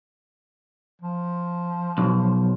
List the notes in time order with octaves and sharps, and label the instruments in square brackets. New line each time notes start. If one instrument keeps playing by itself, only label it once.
[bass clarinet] F3
[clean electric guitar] B1